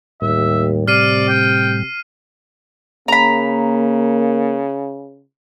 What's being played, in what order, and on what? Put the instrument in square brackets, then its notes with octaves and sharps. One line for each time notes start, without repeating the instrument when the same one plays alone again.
[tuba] D#2 [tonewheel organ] A2 G3 [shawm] E5
[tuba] C3 [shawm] D5 [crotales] F6 C7 D#7
[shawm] G5
[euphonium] C#3 [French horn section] A#3 [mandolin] A#5 B5